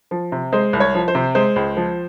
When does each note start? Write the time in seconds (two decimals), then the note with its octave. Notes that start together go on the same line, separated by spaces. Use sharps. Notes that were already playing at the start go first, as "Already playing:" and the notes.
0.11 F3
0.32 C3
0.52 G#3 C5
0.73 C2
0.80 C#5
0.94 F3
1.08 C5
1.15 C3
1.35 G#3 C5
1.56 C#2
1.77 F3